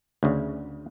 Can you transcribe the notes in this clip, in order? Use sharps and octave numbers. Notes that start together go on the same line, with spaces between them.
D2 C#3